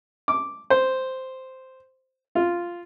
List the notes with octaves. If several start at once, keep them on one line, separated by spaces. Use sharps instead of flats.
D6
C5
F4